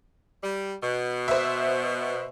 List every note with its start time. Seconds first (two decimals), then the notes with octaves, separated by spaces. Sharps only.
0.43 G3
0.82 B2
1.28 C5 E5